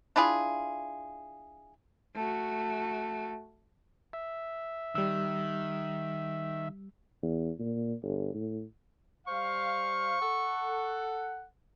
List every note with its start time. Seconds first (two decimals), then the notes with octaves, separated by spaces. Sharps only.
0.16 D4 E4 F4 G#4
2.15 A3 F#4
4.13 E5
4.95 D#3 G3 E6
7.22 E2
7.59 A#2
8.02 G1
8.34 A2
9.27 G3 C5 F5 C#6
10.22 A4 F#5